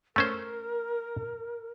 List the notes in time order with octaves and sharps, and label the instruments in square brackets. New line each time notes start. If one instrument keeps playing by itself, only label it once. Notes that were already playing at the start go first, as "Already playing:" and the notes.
[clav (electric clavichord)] A3 C#4 C5 [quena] A#4